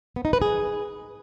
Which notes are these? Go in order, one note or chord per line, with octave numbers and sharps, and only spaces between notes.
B3
D#4
B4
G#4